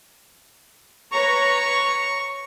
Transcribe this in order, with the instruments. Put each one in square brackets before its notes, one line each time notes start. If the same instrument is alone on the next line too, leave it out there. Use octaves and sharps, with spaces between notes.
[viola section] B4 C#5 A#5 [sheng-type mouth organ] C#6